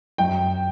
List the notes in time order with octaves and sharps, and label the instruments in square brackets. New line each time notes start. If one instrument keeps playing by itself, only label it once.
[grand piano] F#2 G5